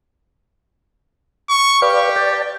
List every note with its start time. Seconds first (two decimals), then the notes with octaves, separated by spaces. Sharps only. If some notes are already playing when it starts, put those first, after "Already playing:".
1.49 C#6
1.82 G4 B4 D5 F5
2.16 D5 G5 A5